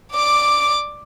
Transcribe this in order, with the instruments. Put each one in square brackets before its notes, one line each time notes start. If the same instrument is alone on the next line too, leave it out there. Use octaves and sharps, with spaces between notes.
[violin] D5 D6